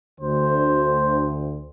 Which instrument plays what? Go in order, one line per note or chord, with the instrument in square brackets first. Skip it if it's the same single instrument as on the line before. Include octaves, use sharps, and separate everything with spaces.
[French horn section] D2 [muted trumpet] C5